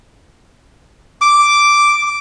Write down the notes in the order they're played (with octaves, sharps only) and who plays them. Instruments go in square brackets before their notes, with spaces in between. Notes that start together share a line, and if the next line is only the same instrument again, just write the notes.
[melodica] D6